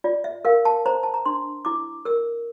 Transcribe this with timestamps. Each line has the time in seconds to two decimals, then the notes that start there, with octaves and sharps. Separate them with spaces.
0.04 F4 D5
0.24 E5
0.45 A#4 F5
0.65 A5
0.86 C5 A#5
1.03 A5
1.14 A#5
1.26 D4 C6
1.65 E4 D6
2.05 A#4 E6